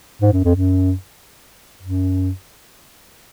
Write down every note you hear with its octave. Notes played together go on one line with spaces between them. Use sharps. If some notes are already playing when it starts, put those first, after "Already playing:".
G#2
F#2
F2
F#2
F#2